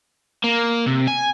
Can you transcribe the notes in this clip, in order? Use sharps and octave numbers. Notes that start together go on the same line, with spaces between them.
A#3
C3
G#5